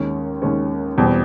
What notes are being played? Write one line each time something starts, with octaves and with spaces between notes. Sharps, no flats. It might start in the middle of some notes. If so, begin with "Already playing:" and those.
Already playing: D#2 D#3 G#3 C#4
D#2 D#3 G#3 C#4
E2 B2 G3 C4